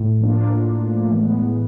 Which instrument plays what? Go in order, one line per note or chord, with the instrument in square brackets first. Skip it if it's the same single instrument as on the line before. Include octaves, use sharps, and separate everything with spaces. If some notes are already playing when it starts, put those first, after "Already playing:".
Already playing: [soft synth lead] A2
[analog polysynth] F3 A#3 D4 F4
E3 G#3 B3